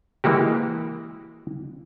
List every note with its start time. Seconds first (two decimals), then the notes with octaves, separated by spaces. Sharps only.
0.24 E3 G#3 A#3 F#4 G4